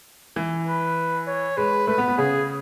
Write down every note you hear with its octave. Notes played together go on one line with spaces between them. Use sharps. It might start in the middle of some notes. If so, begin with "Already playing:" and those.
E3
B4
C#5
G#3 B4
A3 B4
B3
B3
C#3 G#4